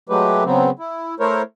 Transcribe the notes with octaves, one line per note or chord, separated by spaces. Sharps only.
F#3 G#3 A3 G4 B4
C#3 F#3 B3 C4
E4
A3 E4 A#4 C5 C#5